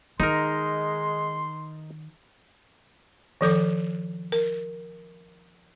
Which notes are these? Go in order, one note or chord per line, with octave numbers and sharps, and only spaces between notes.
D#3 G#3 D#4 A#4 C6
D#3 F3 A4 D6
A#4